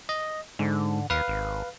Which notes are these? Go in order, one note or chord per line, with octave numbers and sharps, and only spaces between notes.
D#5
G#2 D3
D#2 B4 F5
G#1